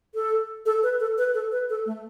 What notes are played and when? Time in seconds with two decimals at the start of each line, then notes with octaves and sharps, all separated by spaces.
0.15 A4
0.66 A4
0.83 B4
1.00 A4
1.18 B4
1.34 A4
1.52 B4
1.70 A4
1.86 A3